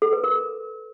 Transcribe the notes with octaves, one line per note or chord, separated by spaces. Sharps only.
A4
B4
A#4